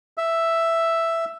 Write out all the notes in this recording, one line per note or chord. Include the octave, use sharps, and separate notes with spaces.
E5